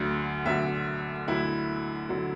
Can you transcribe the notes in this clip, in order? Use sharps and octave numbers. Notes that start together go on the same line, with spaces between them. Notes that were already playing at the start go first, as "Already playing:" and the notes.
Already playing: D2 D3 F#3
D2 D3 F#3 E5
D2 D3 F#3 E4
D3 F#3